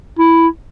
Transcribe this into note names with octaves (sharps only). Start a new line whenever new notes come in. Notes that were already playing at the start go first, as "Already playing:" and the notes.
E4